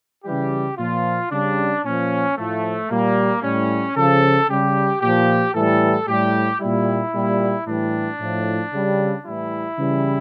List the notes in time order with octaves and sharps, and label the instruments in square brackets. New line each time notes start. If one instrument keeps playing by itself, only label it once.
[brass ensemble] C#3 E3 G3 G4
A#2 F3 F4
C#3 G3 D4
A#2 F3 C#4
A2 F3 A3
A#2 G3 A#3
A2 G3 C#4
C#3 F3 A4
C#3 G3 G4
A#2 F3 G4
A2 E3 G3 A4
A2 G3 G4
A#2 G3 E4
A#2 G3
A2 E3 G3 D4
A2 F3
C#3 G3
A2 E3 G3 E4
C#3 E3 G3